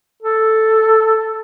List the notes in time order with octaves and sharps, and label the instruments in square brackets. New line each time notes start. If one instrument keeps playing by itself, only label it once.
[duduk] A4